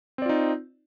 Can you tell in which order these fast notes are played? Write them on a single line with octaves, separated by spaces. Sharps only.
C4 D5 F4 D#4